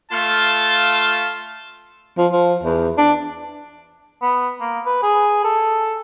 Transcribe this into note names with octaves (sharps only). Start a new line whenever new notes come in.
A3 F4 F5 A5 C6
F3
F3
E2
D4
B3
A#3
B4
G#4
A4